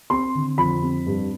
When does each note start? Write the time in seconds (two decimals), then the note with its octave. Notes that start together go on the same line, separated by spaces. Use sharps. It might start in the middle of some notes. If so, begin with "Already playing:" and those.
0.10 C4 C6
0.35 D3
0.58 F2 B5
0.83 C4
1.07 G2